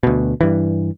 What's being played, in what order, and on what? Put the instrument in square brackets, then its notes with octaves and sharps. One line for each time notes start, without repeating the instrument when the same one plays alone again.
[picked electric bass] D2 B2
G2 E3